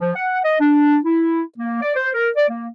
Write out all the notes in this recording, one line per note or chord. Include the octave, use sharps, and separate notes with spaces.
F3
F#5
D#5
D4
E4
A#3
D5
C5
A#4
D5
A#3